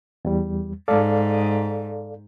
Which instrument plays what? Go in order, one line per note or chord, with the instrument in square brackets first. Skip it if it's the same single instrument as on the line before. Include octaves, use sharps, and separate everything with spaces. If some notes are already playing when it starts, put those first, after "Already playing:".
[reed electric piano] E2 G3
[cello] G#2 [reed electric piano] A4 D5 F5